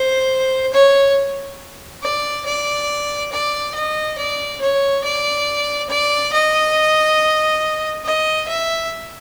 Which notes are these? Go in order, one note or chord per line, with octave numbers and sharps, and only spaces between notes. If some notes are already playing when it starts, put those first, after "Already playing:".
Already playing: C5
C#5
D5
D5
D5
D#5
D5
C#5
D5
D5
D#5
D#5
E5